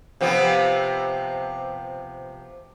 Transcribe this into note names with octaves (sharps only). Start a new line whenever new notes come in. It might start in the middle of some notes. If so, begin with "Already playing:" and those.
C3 F3 B3